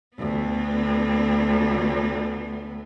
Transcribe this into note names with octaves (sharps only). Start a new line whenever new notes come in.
D2 B3